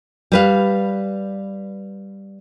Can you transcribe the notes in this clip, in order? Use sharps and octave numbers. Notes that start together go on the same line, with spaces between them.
G3 B4 F5